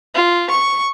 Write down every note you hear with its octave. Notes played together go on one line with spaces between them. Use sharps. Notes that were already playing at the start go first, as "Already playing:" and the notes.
F4
C#6